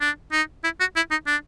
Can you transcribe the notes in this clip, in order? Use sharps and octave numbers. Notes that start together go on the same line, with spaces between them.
D4
D#4
E4
F#4
E4
D#4
D4